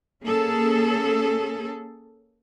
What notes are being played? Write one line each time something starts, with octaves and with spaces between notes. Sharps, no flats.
A#3 C#4 G#4 A4